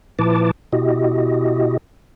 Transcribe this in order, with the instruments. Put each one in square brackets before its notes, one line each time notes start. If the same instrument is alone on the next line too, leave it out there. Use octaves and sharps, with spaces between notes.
[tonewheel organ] A#2 F3 E4 B4 A5 D6
B2 E4 F#4 G4 D#5